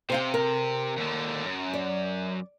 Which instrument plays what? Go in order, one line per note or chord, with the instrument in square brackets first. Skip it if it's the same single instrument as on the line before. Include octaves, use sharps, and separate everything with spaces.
[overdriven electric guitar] C3 [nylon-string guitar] C5 F5 G5
[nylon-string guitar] A#4
[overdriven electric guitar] D#2 D3
F#2
[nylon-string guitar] D5